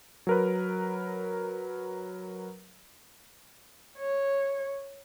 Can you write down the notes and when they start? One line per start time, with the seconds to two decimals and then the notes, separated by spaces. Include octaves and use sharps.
0.27 F#3 A#4 B4
3.98 C#5